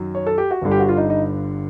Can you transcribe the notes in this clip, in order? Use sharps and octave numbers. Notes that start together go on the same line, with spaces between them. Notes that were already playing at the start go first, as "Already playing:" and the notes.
Already playing: F#2 D#3 F#3
C#5
A4
G4
F#4
G1 G2 D3 G3
G4
F#4
F4
D#4
D#4